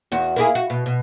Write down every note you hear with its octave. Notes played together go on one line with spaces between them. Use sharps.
E2 F#4
A#3 E4 G#4
F#4
B2
B2